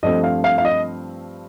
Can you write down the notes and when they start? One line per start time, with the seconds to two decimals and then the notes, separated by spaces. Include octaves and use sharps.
0.03 G2 F3 A3 C4 D#5
0.23 F5
0.44 F5
0.58 F5
0.65 D#5